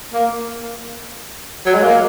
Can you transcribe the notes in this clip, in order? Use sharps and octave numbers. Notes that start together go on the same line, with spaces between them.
A#3
F#3
G#3
A#3